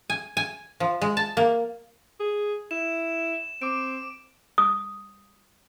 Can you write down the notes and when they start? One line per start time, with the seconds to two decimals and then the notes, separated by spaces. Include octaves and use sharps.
0.10 G#5
0.37 G#5
0.80 F3
1.01 G#3
1.17 A5
1.37 A#3
2.20 G#4
2.71 E4 E7
3.62 C4 D6 D7
4.58 D#6